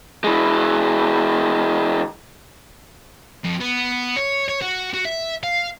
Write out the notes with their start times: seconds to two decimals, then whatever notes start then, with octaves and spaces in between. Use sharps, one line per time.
0.24 E3 G#3
3.44 F2
3.60 B3
4.16 C#5
4.48 C#5
4.62 F#4
4.94 F#4
5.05 E5
5.43 F5